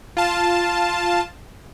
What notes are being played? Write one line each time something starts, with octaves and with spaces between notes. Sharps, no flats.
F4 A5